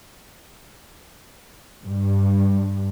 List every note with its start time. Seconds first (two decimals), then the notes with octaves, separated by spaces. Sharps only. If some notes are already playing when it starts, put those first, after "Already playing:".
1.85 G2